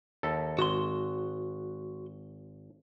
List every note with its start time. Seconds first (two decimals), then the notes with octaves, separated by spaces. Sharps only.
0.23 D#2 A4
0.59 G#1 F#4 C6